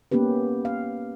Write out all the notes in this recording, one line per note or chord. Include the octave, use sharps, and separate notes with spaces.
A#3 B3 C#4 G4 B4
F5